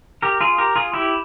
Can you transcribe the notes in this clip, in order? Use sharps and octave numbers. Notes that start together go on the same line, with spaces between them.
G4 A#4
F4 G#4
G4 A#4
F4 G#4
E4 G4